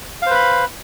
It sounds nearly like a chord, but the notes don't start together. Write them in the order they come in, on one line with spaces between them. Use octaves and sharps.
F5 C5 B4 B5